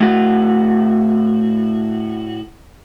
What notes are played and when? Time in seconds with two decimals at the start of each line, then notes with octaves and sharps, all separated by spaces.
0.01 A2 F#4